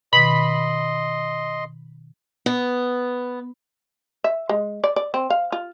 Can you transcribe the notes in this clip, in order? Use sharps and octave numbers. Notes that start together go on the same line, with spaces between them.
B2 D#3 D#5 B5 C6
B3
E5
G#3
D5
D5
C4
F5
F4